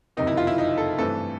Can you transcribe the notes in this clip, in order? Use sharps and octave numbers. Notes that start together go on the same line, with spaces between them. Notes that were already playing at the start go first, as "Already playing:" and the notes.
F#1 F2 C3 D#3 D#4
E4
F4
E4
D#4
A4
G2 E3 A3 C4 A4